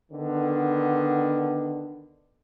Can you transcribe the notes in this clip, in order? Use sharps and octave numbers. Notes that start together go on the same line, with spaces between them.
D3 D#3 B3